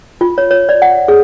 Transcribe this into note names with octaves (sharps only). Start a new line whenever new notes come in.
F4
C#5
C#5
D5
F#5
G#4